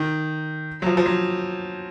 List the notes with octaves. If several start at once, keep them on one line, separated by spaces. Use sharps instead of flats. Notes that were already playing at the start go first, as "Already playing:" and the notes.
Already playing: D#3
F#3
F3
F3
F#3